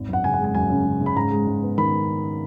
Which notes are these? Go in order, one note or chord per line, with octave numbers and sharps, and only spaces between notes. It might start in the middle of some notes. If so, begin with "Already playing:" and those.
Already playing: G#1
F#2 F#5
C#3 G#5
F#5
G#3 G#5
F#2 G#5
C#3
C#3
C#3
B5
G#2 A#5
G#3
G#2
B3
D#3 B5